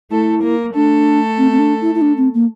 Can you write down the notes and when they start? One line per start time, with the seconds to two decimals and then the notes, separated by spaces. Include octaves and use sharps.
0.11 A3 E4 A4
0.43 A#3 A#4
0.74 A3 D4 A4
1.38 C4
1.51 C4
1.59 D4
1.81 E4
1.95 E4
2.01 D4
2.17 C4
2.34 A#3